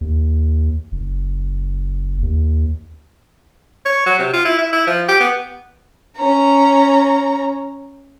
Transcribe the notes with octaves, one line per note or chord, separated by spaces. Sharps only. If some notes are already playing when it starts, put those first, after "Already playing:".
D#2
F#1
D#2
C#5
F#3
C3
F4
E4
E4
E4
F3
G4
B3
C#4 A#5